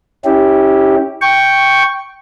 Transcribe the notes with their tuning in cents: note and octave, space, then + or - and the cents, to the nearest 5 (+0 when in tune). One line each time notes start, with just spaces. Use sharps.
C#4 +0 E4 -30 G4 +0
G5 +0 C#6 +0